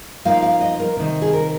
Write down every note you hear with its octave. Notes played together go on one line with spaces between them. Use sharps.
F3 A#3 D#4 F5
F5
D#5
A#4
C3 D#3 A#3
G#4
A#4